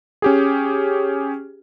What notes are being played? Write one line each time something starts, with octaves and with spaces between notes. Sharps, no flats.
C#4 G4 G#4